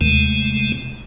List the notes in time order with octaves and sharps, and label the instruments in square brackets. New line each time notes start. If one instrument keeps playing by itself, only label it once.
[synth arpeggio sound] D#2 [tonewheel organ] C3 G#3 A3